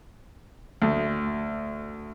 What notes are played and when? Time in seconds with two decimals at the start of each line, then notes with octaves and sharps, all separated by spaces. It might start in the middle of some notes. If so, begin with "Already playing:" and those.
0.82 D2